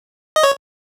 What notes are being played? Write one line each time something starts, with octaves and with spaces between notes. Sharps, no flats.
D#5
C#5